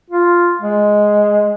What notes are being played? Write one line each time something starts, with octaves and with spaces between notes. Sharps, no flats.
F4
G#3